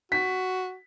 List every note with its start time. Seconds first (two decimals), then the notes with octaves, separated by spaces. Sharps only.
0.12 F#4 B6